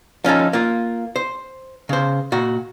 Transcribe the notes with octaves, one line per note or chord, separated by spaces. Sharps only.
F3 C#4 D#4 A4
A#3 F4
C5
C#3 C5
A#2 F#4